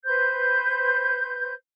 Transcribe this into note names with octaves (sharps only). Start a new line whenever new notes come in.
B4 C5 G6